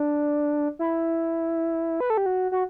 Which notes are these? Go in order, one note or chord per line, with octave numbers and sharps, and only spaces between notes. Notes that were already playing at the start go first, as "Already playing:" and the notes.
Already playing: D4
E4
B4
A4
G4
F#4
F#4